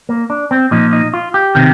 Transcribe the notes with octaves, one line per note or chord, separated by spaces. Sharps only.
A#3
D4
C4
A#2 F3 D#4
D#4
F4
G4
C3 D#3